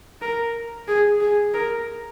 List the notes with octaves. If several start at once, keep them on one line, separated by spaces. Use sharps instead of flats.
A#4
G#4
G#4
A#4